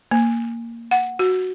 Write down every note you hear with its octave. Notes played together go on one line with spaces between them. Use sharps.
A#3
F#5
F#4